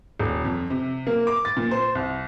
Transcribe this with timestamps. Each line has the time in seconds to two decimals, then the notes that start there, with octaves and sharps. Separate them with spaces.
0.19 D#1
0.45 F2
0.70 C3
1.07 A#3
1.27 D6
1.45 A6
1.57 A#2
1.71 C5
1.95 C2